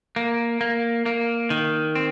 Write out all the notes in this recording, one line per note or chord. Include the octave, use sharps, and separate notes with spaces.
A#3
A#3
A#3
D#3
C4